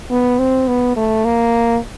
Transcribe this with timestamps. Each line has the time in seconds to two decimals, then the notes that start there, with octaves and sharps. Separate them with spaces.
0.10 B3
0.39 C4
0.68 B3
0.96 A3
1.25 A#3